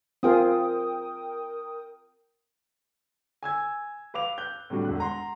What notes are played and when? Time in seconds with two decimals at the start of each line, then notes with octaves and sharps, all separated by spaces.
0.23 C4 F4 G#4 A#4 G5 D#6
3.43 G#5 E6 G#6
4.14 B4 F5 D6 F7
4.38 F#6 G6
4.70 A2 C3 G3 D4 F#4
4.85 E1 E2 F#6
4.98 F#5 A#5 C6